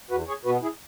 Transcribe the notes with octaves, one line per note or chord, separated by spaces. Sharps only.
E2 F#4 B4
G#4 C#5
B2 B3 F#4 B4
E4 G#4